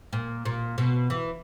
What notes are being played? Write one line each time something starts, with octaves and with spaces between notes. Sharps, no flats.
A#2
A#2
B2
E3